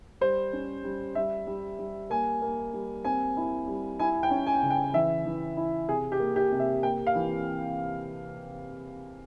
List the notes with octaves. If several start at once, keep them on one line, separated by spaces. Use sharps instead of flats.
G3 C5
C#4
G3
G3 E5
G3
G3
A#3 G#5
A#3
G3
C4 G#5
E4
G3
E4 G#5
G5
C#4
G#5
C#3
G5
E3 E5
E3
E4
C3 G#4
G4
A#3
G4
C3
E5
A#3 G5
F5
E3